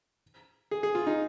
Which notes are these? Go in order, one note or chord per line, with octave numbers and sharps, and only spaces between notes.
G#4
G#4
F4
D#4